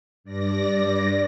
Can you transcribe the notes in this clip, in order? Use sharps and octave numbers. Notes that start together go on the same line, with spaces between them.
G2 D5 A#6